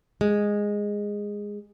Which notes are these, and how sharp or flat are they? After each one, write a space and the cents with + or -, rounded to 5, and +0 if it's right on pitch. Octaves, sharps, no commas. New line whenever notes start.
G#3 -10